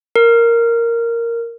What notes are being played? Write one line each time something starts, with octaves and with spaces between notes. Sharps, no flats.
A#4